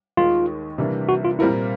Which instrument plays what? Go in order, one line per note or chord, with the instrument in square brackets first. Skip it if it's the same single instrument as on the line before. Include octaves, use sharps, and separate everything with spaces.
[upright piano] D#2 D#3 G#3 [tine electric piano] F4
[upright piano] C3 E3 G3 A#3 D4
[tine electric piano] F#4
F4
[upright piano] A#2 G3 C4 F4 A#4 [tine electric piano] E4